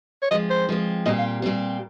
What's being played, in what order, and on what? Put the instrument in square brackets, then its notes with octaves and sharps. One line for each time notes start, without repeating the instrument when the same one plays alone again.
[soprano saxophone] C#5
[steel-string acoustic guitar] F3 G#3 C4 [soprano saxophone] D#5
[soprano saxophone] C5
[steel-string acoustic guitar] F3 G#3 C4
[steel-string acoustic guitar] A#2 G3 C4 G4 [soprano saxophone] D#5
[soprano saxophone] F5
[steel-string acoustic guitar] A#2 G3 C4 G4